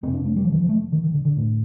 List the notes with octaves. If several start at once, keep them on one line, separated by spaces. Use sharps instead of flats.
F2 C3 C4
D4
A3
G3
F3
D#3
F3
A3
D#3
D#3
D3
D3
A2